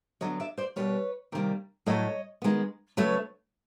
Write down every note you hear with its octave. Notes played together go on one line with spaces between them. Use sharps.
D3 F#3 B3 C#5 D#5
D5 E5
C5 D5
B2 G3 A#3 B4 C#5
C3 D#3 G3 A#3
A2 F#3 A3 C#5 D#5
D#3 G#3 B3
C#3 F#3 A3 B4 C#5